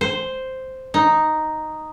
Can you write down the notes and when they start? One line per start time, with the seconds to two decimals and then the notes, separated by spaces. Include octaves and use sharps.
0.01 C5
0.94 D#4